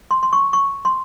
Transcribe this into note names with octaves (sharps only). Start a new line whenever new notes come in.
C6
C6
C#6
C#6
C6